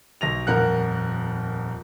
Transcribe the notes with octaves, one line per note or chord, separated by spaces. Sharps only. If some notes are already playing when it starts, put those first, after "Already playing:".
B1 A#6 F7
D#1 F2 A#4 F#5 F#6